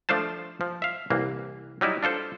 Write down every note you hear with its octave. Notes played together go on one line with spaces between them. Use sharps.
F3 A3 D4 F4 C5 A5
F3
E5 F5
C2 E3 A#3
F#3 G3 D#4 E4
D4 F4 A4 C5